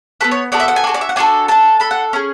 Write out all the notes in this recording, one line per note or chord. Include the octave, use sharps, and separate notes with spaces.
B3 F#4 A4 B4
C#5
B3 F#4 A4 D5
E5
F#5
G#5
D4 F#4 A4
D5
E5
F#5
D4 F#4 A4 G#5
D4 A4 A5
D4 A4 B5
F#5
C#4 G#4